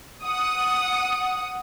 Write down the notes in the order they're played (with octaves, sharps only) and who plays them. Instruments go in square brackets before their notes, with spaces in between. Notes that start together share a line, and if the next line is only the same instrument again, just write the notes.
[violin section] F#5 D#6